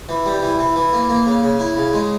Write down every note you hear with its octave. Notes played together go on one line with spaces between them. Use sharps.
E3
G3
E3
E3
E3
A#3
A#3
C#3
C#3
E4
C#3
G#3